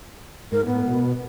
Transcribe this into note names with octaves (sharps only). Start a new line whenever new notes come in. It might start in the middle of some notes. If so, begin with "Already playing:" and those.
G#2 A#4
A2 B3
B2